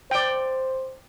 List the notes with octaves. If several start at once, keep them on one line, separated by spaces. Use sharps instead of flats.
C5 D5 G5